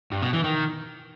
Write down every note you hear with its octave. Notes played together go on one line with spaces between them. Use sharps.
G2
B2
E3
D#3